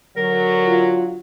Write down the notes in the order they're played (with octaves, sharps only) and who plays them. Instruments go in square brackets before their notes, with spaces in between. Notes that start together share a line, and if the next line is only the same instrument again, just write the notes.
[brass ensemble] D3 F#3 [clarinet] A#4
[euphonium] F4